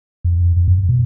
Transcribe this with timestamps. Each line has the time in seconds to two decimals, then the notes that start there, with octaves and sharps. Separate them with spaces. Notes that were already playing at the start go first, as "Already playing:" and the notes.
0.24 F2
0.57 F2
0.68 F#2
0.89 B2